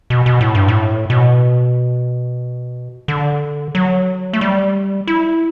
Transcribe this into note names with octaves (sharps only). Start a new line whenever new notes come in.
B2
B2
A2
G2
A2
B2
D3
F#3
A3
G3
E4